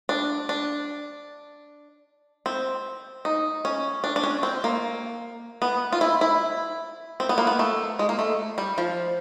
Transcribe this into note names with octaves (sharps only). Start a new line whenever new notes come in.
D4
D4
C4
D#4
C#4
D4
D4
C#4
C4
A#3
B3
F4
E4
E4
C4
B3
A#3
B3
A3
G#3
A#3
A3
G3
F3